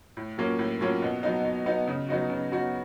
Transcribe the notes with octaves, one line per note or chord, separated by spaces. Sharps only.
A2
F#3 A#3 C#4 F4
A2
F#3 A#3 C#4 F4
B2
F#3 B3 D#4
B2
F#3 B3 D#4
C#3
F#3 B3 D#4 F#4
C#3
F#3 B3 D#4 F#4